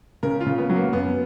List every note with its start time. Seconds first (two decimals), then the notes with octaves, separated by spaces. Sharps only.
0.23 C#3 A#4
0.40 F4
0.46 C#3
0.58 B3
0.69 F#3
0.76 A#3
0.93 F#2 B3